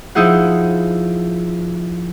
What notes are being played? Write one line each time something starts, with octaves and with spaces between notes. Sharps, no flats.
F3 D#4 E4 G#4 F#5